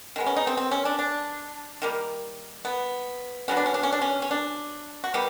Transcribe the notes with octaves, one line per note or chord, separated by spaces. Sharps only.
D#3 G#3 B3
C#4
D#4
C4
C4
C#4
D4
D4
D#3 G3 A#3
B3
D3 F#3 B3 C#4
D4
C#4
D4
C#4
D4
C#4
C#4
D4
F#4
D#3 G3 B3 G4